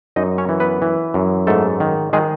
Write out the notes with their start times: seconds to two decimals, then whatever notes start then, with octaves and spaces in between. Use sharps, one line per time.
0.16 F#2 D#4 D#5
0.38 C#4 C#5
0.49 E3
0.60 B3 B4
0.82 E3
1.14 F#2
1.47 G#2 A3 A4
1.80 D#3
2.13 D#3 G#3 G#4